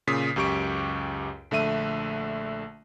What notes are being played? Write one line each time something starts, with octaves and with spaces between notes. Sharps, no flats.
A#2 C#3 D#6 B6 C7
C#2 F#2 G4 C#6 D7
A#1 D3 A3 E5 D#7